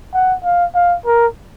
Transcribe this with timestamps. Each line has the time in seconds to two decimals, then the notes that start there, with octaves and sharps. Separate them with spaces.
0.14 F#5
0.44 F5
0.75 F5
1.06 A#4